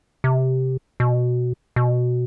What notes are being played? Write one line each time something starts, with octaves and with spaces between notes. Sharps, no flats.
C3
B2
B2